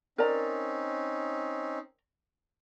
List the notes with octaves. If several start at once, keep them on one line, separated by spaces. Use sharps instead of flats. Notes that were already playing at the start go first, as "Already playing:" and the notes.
C4 C#4 D#4 A#4 D5 A#5